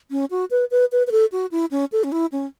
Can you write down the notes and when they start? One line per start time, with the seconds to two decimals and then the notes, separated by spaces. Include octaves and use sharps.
0.11 C#4
0.31 F#4
0.51 B4
0.71 B4
0.92 B4
1.07 B4
1.12 A4
1.32 F#4
1.52 E4
1.71 C#4
1.92 A4
2.04 C#4
2.12 E4
2.32 C#4